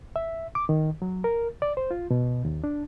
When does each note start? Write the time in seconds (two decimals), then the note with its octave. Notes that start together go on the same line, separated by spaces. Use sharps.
0.16 E5
0.55 D6
0.69 D#3
1.02 F#3
1.24 A#4
1.62 D5
1.77 C5
1.91 F4
2.11 B2
2.45 D#2
2.64 D4